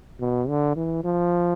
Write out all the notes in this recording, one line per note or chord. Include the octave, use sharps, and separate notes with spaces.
B2
D3
E3
F3